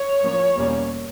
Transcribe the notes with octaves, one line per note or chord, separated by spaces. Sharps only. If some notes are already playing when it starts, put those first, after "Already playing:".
Already playing: C#5
A2 F3 A#3 C#4
E2 B2 G3 A#3 C#4